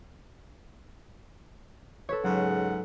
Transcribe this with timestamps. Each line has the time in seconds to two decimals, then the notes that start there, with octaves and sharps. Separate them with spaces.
2.09 A4 B4 C#5
2.23 G#2 C#3 F#3 F#5